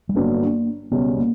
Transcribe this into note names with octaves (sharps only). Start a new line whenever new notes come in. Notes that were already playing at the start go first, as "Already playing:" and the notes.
G3
G1 G2 F#3 A#3 B3
C#2 B2 G3 B3 C#4
A#3